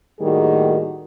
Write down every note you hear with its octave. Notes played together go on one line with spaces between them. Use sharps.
A2 D#3 G3 A#3 F#4 G#4